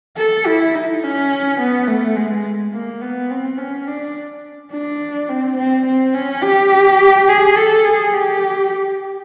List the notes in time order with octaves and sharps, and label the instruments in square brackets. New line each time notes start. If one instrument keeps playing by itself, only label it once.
[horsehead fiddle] A4
E4
D#4
C#4
B3
A3
G#3
A#3
B3
C4
C#4
D4
D4
C4
C4
C4
C#4
G4
G#4
A4
G#4
G4